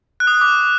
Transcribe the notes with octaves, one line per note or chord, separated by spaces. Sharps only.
F#6
D#6
F#6
D6